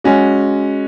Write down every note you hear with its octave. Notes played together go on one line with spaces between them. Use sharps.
G#3 C#4 F#4